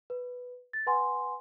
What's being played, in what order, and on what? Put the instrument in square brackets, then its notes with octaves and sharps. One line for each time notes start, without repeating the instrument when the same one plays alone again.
[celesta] B4
A6
B4 F#5 G#5 C6